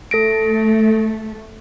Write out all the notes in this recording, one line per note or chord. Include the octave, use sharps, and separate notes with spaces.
A3 A4 A#6 D7